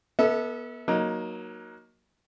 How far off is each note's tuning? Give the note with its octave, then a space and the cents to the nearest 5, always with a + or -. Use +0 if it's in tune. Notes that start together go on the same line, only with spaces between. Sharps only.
B3 -25 A4 +5 E5 -40
F#3 +0 A#3 +20 D#4 +0